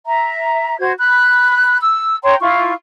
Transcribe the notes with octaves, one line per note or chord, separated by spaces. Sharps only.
E5 A#5
F#4 C5 G#6
B5 F#6
E6
C#5 G5 A#5 C6
E4 F4 C#6